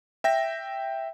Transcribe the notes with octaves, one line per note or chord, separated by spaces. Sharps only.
E5 G5 A#6